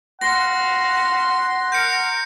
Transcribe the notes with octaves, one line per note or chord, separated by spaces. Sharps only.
F#4 B4 F5 F#5 C6 A#6
A#4 G6 C#7